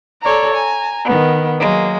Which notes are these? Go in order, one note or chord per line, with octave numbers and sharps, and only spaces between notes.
A4 C#5 D5 A#5
G#5 A#5
D#3 B3
F#3 G#3 A#3